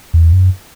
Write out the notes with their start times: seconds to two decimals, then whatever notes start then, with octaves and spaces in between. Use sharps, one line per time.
0.14 E2
0.33 F#2